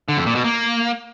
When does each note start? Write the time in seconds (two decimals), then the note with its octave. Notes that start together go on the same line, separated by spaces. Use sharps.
0.08 D3
0.17 F2
0.26 A#2
0.35 B2
0.44 A#3